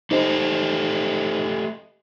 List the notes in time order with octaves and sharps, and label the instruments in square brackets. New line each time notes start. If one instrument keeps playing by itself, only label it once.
[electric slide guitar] A3 G4 D#5 [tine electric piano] D#4 C5